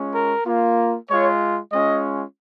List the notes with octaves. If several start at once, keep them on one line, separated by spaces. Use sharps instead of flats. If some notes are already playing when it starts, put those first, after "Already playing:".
Already playing: G#3 C#4 F4
A#4
A#3 F4
G#3 F4 C#5
G#3 C#4 F4 D#5